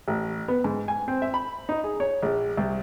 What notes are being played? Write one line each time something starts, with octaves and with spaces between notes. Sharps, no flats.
A1
B3
G#2
G#5
C4
E5
B5
D#4
G#4
C#5
A#1
C2